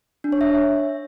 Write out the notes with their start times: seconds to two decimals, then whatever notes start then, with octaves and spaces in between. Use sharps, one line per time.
0.24 D4
0.32 C#5
0.41 E5